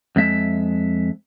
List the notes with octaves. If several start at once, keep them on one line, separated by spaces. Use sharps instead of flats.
F2 G#3 E5